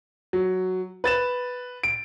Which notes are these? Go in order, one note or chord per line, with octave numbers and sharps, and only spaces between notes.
F#3
B4 A6 E7
D7